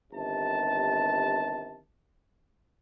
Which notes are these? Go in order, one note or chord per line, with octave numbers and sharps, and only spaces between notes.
G1 C3 D#3 A5